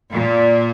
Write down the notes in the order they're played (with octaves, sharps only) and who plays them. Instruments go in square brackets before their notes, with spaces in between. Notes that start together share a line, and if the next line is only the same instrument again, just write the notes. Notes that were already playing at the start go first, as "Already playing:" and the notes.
[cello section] A#2